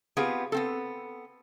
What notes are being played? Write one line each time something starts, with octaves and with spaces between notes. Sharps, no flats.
B3 C4 F4 G4 G#4
B3 C4 A4